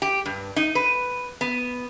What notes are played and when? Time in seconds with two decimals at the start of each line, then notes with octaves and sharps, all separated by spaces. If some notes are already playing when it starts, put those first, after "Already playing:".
0.02 G4
0.26 G2
0.56 D#4
0.75 B4
1.41 B3